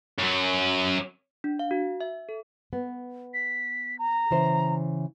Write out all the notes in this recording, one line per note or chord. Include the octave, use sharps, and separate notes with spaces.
F#2 F#3
D4
F5
F#4
E5
A4
B3
B6
A#5
C#3 E3 C5